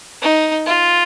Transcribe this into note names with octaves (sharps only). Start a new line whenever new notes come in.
D#4
F4